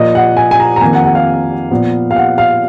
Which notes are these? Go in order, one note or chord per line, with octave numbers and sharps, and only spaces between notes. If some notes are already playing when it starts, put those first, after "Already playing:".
Already playing: A#2 F3 A#3 D#5
F#5
G#5
G#5
A#5
A#5
F2 D#3 A#3 G#5
F#5
F#5
F5
A#2 F3 B3
F5
F#5
F5